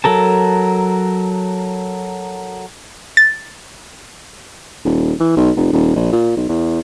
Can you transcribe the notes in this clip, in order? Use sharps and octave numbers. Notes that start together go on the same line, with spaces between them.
F#3 A4 A#4 A5
A6
D#1
E3
B1
F1
D#1
A#1
A#2
B1
E2